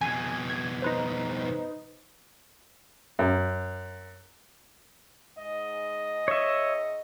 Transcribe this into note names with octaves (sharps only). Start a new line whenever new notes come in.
F2 B2 G#5
G#6
D#4 B4 C5
F#2
G#2 D#5
C#5 E5